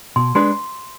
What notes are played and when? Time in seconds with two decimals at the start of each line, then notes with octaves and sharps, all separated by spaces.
0.16 B2 C6
0.35 G#3 D4 G#4 B4 C6